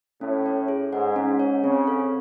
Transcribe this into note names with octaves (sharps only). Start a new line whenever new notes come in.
A2 C#4
C#5
G#4
G#2 F#5
C#4
C#5
C#3 C4
A4